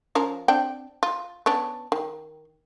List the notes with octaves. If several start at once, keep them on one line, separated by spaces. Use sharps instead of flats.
F3 C#4 A#4
C4 D4 G5
F4
B3 C#4 D4
D#3